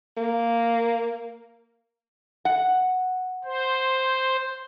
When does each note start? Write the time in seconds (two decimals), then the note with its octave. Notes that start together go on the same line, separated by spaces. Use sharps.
0.17 A#3
2.45 F#5
3.45 C5